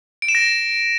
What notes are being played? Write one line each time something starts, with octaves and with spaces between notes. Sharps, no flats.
D7
E7
A#6